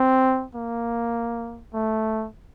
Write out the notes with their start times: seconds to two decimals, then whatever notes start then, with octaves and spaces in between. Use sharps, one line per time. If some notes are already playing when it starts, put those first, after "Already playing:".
Already playing: C4
0.55 A#3
1.73 A3